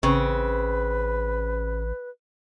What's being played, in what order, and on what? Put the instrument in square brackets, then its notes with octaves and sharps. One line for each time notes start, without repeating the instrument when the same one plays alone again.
[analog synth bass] A1 [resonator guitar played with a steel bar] C#3 C4 [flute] B4